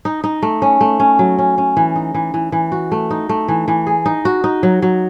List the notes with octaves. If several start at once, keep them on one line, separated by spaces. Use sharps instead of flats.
D#4
D#4
A3
C#4
A3
C#4
F#3
C#4
C#4
E3
D#4
E3
E3
E3
F#4
A3
D#4
A3
E3
E3
G#4
D#4
F#4
D#4
F#3
F#3